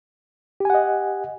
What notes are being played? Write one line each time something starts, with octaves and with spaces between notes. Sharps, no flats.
G4 D#5 F#5 G#5